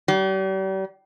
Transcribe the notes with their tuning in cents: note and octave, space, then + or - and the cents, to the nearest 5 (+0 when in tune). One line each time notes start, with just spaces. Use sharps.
G3 -40